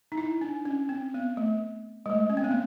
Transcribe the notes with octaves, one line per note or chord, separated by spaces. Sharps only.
D#4
E4
D4
C#4
C4
B3
A3
G#3
A3
C#4
C4
B3
A#3